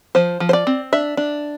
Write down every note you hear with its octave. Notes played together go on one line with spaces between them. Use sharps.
F3 C5
F3
C5
D5
C4
D4 E5
D4